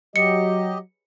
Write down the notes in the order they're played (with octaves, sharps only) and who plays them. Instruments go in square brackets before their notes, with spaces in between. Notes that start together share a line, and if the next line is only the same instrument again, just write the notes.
[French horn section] F#3 [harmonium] G4 D#5 [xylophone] C#7